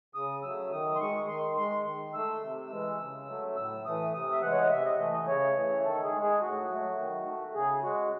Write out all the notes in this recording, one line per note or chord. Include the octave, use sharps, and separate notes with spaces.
C#3 D#6
F#3 A3 E6
D#3 D#6
C6
G#3 C#6
D#3 C6
G#3 C6
D#3
A3 E6
C3
E3 G#3
C#3
F#3 A3
A2 E6
E3 A3 D#6
C3 D#6
E5
E3 G#3 F#5
C#5
D#5
C3 E5
D#5
E3 A3 D#5
D#5
C#3 C#5
E3 A3
D#3 A4
G#4
G#3
G#4
A2 F#4
F#3 A3
D#3
A3
C#3 G#4
G#3 F#4